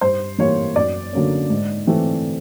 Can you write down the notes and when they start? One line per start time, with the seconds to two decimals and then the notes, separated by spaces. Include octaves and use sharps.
0.01 G2 C5
0.38 E3 G3 A#3 C#5
0.76 F#2 D5
1.13 D3 F#3 A#3 C#4
1.50 G#2
1.87 E3 A3 C4